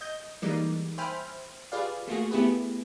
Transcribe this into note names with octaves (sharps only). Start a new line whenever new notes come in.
D#5 G6
E3 G3 G#3 A#3 D#4 D5
C5 E5 G5 G#5 B5 F6
F4 G4 G#4 B4 D5 F5
A3 A#3 F4 F#4 G#4
A3 B3 E4 G4 G#4 B4